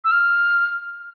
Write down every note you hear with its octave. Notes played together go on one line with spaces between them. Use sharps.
E6
F6